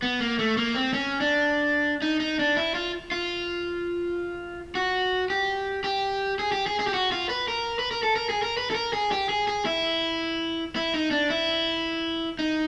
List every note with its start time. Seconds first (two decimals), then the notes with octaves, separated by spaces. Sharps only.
0.02 B3
0.20 A#3
0.39 A3
0.57 A#3
0.75 C4
0.93 C#4
1.20 D4
2.02 D#4
2.20 D#4
2.39 D4
2.57 E4
2.75 F4
3.12 F4
4.75 F#4
5.30 G4
5.84 G4
6.39 G#4
6.52 G4
6.67 G#4
6.80 G#4
6.87 G4
6.94 F#4
7.12 F4
7.29 B4
7.48 A#4
7.79 B4
7.91 A#4
8.03 A4
8.16 A#4
8.30 G#4
8.43 A#4
8.57 B4
8.71 A4
8.75 A#4
8.93 G#4
9.12 G4
9.29 G#4
9.48 G#4
9.65 E4
10.76 E4
10.94 D#4
11.11 D4
11.30 E4
12.39 D#4